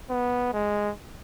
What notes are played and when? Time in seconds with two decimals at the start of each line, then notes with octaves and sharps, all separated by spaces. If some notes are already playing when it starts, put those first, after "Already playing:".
0.10 B3
0.53 G#3